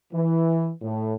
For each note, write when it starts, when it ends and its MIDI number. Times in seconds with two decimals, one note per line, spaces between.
0.12 0.70 52
0.82 1.14 45